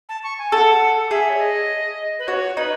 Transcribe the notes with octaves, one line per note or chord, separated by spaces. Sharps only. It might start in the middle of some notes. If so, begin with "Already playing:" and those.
A5
C#6
G#5
A4 F#5
G#4 E5
C#5
D#5
B4
F#4 C#5
D#4 B4